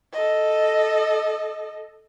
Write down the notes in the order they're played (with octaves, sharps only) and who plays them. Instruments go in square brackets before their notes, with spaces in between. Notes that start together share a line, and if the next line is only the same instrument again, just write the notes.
[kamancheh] A4 D#5